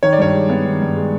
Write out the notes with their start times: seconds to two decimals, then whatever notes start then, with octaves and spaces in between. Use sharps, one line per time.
0.03 D#3 C#5
0.13 D5
0.18 G2 C#5
0.34 G#3
0.50 B3
0.65 D#3
0.82 G2
0.96 G#3